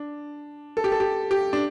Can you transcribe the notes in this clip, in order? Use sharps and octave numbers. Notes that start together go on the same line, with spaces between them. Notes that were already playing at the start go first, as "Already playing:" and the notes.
Already playing: D4
A4
G4
A4
G4
G4
D4